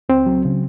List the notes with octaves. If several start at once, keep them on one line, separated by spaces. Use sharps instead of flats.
C#2 C4
F#3
C#3